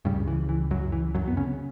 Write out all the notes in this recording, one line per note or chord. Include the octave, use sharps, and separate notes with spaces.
C#2 G2 C#3 G3
E3
E3
F#2 F#3
E3
F#2 F#3
B3
C#3 C#4